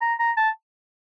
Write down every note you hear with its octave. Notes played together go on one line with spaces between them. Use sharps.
A#5
A#5
A5